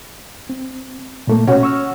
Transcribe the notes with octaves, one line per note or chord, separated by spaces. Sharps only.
C4
A#2 A3 A#3
B2 C#4 F#4
C#6 E6 F6